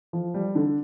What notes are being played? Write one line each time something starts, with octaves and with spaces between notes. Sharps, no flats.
F3
G3
D3